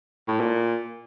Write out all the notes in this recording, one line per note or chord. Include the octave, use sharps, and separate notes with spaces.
A2
A#2